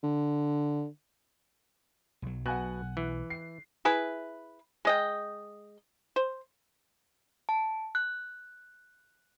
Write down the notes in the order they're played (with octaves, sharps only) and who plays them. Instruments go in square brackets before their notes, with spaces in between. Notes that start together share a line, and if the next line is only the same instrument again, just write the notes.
[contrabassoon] D3
[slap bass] B1 F#3
[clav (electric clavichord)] B2 [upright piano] F#5 G#5 F#6
[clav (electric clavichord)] E3
[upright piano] C7
[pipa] E4 G#4 B4
G#3 D#5 G5
C5
[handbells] A5
F#6